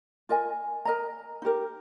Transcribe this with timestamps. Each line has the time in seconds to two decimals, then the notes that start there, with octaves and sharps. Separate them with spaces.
0.29 F4 A#4 D#5 G#5
0.85 A#4 D#5 A#5
1.42 D#4 G4 A#4